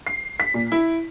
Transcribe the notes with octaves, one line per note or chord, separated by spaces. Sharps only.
C7
B6
A#2
E4